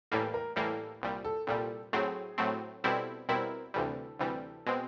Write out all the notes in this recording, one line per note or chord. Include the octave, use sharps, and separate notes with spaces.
A2 E3 G3 A#3 A4
A#4
A2 E3 G3 A#3 A4
C2 A#2 G3
A4
C2 A#2 G3 A4
A2 F#3 A3 C4 G#4
A2 F#3 A3 C4
B2 G3 C4 E4 A4
B2 G3 C4 E4 A#4
D2 C3 E3 G3 A4
D2 C3 E3 G3
B2 G#3 C4